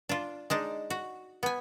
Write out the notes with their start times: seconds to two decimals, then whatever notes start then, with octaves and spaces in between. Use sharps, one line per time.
0.09 D4 F4
0.50 G#3 D4 D#4
0.90 F#4
1.43 B3 G#5